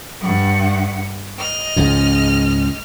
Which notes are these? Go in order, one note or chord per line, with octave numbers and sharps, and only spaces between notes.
G2 F#5
D#5 F6
C#2 G#2